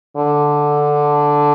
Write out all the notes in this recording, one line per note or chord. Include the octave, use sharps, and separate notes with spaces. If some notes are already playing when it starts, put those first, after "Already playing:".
D3